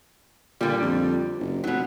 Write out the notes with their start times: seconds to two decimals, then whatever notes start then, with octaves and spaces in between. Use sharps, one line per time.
0.61 A#2 D3 G3
0.82 F2
1.40 F#1
1.64 F1 B2 F#3